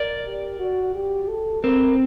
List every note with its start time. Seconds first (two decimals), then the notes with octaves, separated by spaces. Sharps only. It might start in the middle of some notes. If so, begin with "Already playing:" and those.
Already playing: A#4 D5
0.26 G4
0.59 F#4
0.95 G4
1.29 A4
1.63 C4 A#4